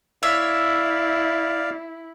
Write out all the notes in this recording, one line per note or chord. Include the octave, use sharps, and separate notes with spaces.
E4 C#5 D5 E5 F5